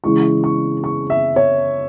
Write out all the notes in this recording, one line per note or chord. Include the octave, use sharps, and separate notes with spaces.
C#3 E3 G#3 E4 C#6
C#6
C#6
E5
C#5